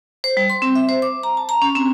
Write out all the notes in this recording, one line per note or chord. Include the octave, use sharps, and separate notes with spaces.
C5
G3
C6
C4
E5
C5
D6
A#5
A5
A#5
C#4
C4